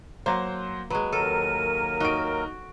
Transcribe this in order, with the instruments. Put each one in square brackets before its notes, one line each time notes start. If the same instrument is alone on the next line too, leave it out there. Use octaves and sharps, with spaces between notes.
[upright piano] F#3 C5 [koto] A#3
[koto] F#3 G#3 [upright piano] B4
[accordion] D#2 F#3 A#4 [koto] A4 [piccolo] D#7
[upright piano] D#4 D7 [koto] F#4